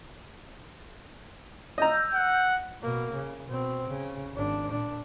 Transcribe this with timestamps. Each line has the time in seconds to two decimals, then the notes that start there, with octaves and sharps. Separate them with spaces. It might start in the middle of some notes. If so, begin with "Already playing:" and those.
1.78 D#5 A#5 E6 G6
2.14 F#5
2.82 B2 A#3
3.13 C#3
3.49 B2 C4
3.89 C#3
4.33 G#1 D4
4.71 A#2 D4